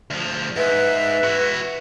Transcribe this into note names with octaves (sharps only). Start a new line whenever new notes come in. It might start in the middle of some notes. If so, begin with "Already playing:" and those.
D2 F3
G#2 B4 E5
E4 F#4